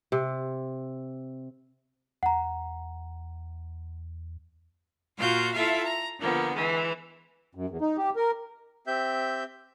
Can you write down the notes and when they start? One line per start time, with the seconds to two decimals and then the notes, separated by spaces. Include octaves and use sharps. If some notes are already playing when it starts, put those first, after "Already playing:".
0.12 C3
2.23 E2 F#5 A#5
5.16 A#2 F4 F#4 F5 G6
5.53 E4 F4 A4 E5 F5
5.83 A#5
6.18 D3 F3 A#3 B3
6.53 E3 G#3
7.55 F#2
7.69 E2
7.81 D#4
7.98 G4
8.16 A#4
8.87 C4 G4 E5 G6